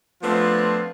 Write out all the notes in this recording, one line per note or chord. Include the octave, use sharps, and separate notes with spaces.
F3 A3 B3 C4 D4 F4